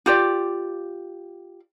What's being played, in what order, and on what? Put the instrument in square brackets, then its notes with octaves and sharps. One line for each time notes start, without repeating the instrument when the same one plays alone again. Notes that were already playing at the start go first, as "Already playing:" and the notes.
[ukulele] F4 G4 D5